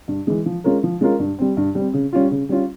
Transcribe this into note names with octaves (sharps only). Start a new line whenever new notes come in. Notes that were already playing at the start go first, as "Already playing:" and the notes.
G2
E3 G#3
F3
G#3 C#4 F4 A#4
F3
G#3 C#4 F4 A#4
G2
G3 C4
G2
G3 C4
C#3
G3 C#4 F4
C#3
G3 C#4 F4